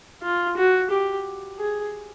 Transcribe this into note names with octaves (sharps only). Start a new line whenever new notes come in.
F4
F#4
G4
G#4